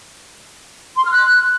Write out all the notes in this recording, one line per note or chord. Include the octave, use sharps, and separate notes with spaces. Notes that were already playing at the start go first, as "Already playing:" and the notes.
C6
F6
F#6